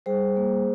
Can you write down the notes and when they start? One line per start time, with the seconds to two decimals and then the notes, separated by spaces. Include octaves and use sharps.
0.06 G3 G#4 C5
0.37 A#3